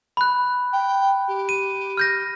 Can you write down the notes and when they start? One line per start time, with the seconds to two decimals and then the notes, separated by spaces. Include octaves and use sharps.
0.17 B5 F#6
0.73 G5
1.28 G4
1.49 D#7
1.97 F6 G6 A#6